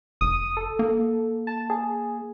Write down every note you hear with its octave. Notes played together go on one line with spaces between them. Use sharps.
F1 D#6
A4
A#3
A5
G#4